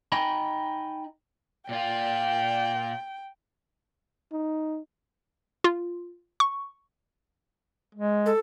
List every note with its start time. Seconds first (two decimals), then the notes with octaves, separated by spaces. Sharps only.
0.12 D#4 D#5 G5 G#5 B5
1.69 A#2 F4 G5
4.32 D#4
5.64 F4
6.40 C#6
7.95 G#3
8.26 A4